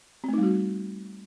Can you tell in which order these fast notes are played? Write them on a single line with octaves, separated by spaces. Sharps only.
C4 A3 D#4 G3 F#4